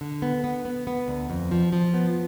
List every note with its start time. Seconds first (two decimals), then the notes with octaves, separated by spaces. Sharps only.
0.01 D3
0.22 B3
0.44 B3
0.65 B3
0.87 B3
1.08 D2
1.30 F2
1.51 F3
1.73 F3
1.94 B3